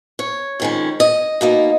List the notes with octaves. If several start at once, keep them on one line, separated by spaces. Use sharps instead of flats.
C#5
F2 D#3 G#3 C#4
D#5
B2 A#3 D#4